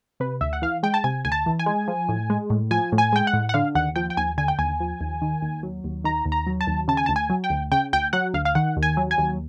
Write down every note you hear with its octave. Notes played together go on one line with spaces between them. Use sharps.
C3 B4
D2 E5
F#5
E3 F5
G#3 G5
A5
C3 G#5
D2 G#5
A5
E3
G#5
G#3
F3
A2
G#3
A2
F3 G#5
A2
G#5
G#3 G5
F#5
A2
F#5
D3 F5
D#2 F#5
F3 G5
G5
D#2 G#5
D3 G#5
G5
D#2 G#5
F3
D#2
D#3
D#2
F#3
D#2
D#3 A#5
D#2
A#5
F#3
A5
D#2
C#3 A5
G#5
D2 A5
G#5
F#3
G5
D2
C#3 G5
D2 G5
F#3 F#5
D2 F5
F5
D#3 F#5
D#2
G#5
F#3
G#5
D#2